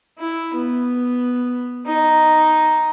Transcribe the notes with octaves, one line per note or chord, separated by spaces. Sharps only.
E4
B3
D#4